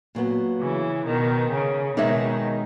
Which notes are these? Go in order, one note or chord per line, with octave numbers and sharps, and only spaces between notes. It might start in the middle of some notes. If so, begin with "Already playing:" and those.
A#2 F#3 B3
C#3 E3
B2 D#3
C#3
B2 D#3 G#3 D#4 G#4 C#5 E5